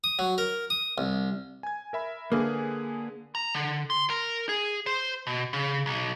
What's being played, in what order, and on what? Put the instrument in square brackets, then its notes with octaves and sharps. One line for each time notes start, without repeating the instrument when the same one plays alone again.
[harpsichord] D#6
F#3
A#4
D#6
C2
[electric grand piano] G#5 G#6
A#4 E5 B5
[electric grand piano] D3 G#4 B4 [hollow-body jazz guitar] A#3
[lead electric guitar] A#5
D3
C6
A#4
G#4
C5
B2
C#3
B1